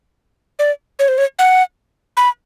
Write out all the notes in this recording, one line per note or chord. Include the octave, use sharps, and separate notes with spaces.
D5
C#5
C5
C#5
F#5
B5